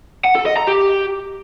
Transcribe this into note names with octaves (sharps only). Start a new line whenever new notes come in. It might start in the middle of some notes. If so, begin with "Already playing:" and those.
F#5
A4
D#5
A#5
G4